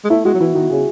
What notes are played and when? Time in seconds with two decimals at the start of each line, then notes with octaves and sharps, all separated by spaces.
0.05 G#3
0.10 A3 E4
0.25 G#3 F#4
0.34 F#3
0.40 E3 E4
0.55 D#3 F#4
0.70 C#3 G#4